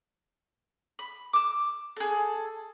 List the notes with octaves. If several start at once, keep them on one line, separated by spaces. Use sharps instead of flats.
B5
D6 E6
G#4 A4